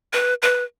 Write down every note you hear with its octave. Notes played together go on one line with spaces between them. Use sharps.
B4
B4